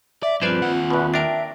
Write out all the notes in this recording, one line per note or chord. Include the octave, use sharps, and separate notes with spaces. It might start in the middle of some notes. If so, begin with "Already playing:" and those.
D5 E5
G2 F3 C4 F4 G#4 B4 C5 D5
D#2 F#5
E2 B2 B4
D4 A#4 E5 G5 A5